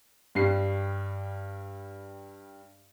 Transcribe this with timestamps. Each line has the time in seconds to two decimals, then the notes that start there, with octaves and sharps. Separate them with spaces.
0.35 G2 G3 C7